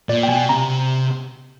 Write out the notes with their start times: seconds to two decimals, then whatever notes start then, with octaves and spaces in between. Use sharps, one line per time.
0.09 A#2 D5
0.23 G5
0.29 B2 G#5
0.49 C3 A#5